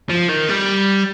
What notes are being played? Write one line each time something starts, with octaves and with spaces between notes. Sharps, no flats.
F3
D#3
G3